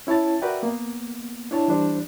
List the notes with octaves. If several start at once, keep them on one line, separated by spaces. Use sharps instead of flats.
C#4 E4 C#5 A5 A6
F#4 A#4 B4 D5 E5 G5
A#3 B3
D4 E4 C#5 A5
E3 G3 D4 C5